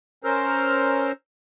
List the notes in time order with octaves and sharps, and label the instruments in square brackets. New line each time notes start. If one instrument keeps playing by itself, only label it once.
[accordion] C#4 A#4 C5 E6 F6